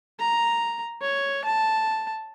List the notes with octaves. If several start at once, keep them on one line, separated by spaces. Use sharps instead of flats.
A#5
C#5
A5